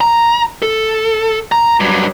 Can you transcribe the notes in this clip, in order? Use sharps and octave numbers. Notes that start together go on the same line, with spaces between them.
A#5
A4
A#5
G2 F#3